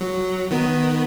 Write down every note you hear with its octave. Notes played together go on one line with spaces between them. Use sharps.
F#3
D#3 B3